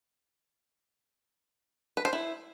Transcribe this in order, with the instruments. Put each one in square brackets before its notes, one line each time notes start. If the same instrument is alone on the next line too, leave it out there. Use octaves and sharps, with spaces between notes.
[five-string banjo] B4
C5
E4